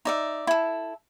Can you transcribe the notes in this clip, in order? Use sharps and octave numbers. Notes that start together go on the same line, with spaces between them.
D#4 D5 E5
E4 A4